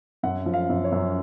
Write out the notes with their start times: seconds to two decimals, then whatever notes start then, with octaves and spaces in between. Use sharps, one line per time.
0.23 F#2 F#5
0.46 F3
0.54 F5
0.69 F#2
0.84 C#5
0.92 F#2